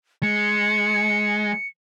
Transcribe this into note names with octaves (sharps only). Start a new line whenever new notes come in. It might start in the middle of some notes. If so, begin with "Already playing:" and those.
G#3 C#7